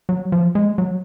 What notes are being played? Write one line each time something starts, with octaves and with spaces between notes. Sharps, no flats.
F#3
F3
G#3
F#3